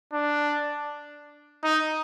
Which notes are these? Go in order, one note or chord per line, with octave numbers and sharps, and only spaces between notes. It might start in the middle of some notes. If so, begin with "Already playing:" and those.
D4
D#4